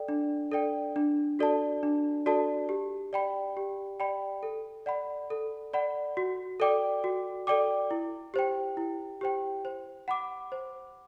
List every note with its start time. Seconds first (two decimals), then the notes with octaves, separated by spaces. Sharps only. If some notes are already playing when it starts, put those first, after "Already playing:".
Already playing: A4 D5 G5
0.08 D4
0.51 A4 D5 G5
0.96 D4
1.39 F#4 A4 D5 A5
1.83 D4
2.26 F#4 A4 D5 A5
2.69 G4
3.13 D5 G5 B5
3.57 G4
4.00 D5 G5 B5
4.43 A4
4.86 D5 F#5 B5
5.30 A4
5.73 D5 F#5 B5
6.17 F#4
6.60 A4 D5 G5 D6
7.04 F#4
7.47 A4 D5 G5 D6
7.91 E4
8.34 G4 C5 G5
8.77 E4
9.21 G4 C5 G5
9.65 C5
10.08 F#5 B5 D6
10.52 C5